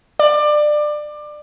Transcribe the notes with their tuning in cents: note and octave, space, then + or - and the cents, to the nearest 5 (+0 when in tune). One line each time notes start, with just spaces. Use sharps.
D5 +25